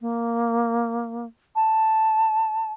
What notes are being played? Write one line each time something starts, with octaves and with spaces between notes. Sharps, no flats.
A#3
A5